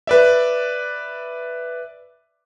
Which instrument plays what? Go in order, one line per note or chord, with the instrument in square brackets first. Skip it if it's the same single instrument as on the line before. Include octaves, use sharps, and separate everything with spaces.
[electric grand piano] B4 D5 E5